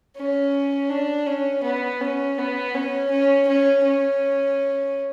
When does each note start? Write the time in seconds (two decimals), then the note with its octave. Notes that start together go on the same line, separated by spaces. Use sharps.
0.17 C#4
0.90 D4
1.27 C#4
1.63 B3
2.01 C#4
2.38 B3
2.74 C#4
3.11 C#4
3.48 C#4
3.85 C#4